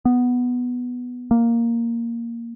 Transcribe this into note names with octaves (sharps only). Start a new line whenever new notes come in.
B3
A#3